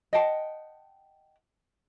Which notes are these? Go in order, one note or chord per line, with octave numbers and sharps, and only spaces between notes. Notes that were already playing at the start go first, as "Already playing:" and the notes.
D#5 F#5 G5 A5